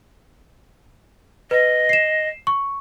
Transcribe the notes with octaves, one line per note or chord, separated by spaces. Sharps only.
B4 D#5
C7 E7
C#6